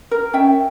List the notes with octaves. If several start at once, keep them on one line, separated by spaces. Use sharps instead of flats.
A#4
C#4 E5 G5